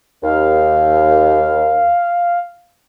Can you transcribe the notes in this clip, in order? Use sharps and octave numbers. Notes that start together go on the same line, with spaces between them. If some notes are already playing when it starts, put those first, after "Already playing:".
D#2 F5